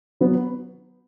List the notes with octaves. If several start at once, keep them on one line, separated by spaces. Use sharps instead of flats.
F#3 B3